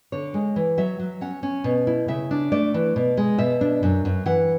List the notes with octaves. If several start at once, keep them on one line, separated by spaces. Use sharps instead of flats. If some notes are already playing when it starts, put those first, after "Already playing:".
D3 C#5
G#3
E3
F#3 E5
F#3
C#4 F#5
C#4
B2
E4
C#3 E5
D4
A3 D5
E3
B2
G#3
B2 E5
D4
F#2
F#2
E3 F#5